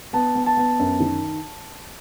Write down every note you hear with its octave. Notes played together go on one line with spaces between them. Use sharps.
B3 A5
B3
A5
B3
F#2
D#3